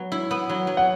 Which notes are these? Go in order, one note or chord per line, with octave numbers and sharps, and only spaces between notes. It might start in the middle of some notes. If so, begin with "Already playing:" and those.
Already playing: F#3 B3
E4
B3
F#3
F#3
F#5